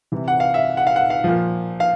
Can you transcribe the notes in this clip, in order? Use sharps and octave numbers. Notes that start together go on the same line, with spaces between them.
C3 E3
F#5
F5
E5
F#5
F5
F#5
F5
A#2 F3
F5